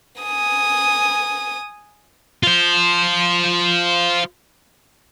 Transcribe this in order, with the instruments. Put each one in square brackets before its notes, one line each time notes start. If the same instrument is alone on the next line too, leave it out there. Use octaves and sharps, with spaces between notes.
[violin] G#5 D#6
[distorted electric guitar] F4 C5